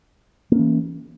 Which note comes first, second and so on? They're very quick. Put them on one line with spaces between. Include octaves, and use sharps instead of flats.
A#3 C#4 E3